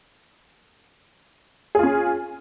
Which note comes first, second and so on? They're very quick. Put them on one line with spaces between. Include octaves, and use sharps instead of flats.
G#4 F4 C#4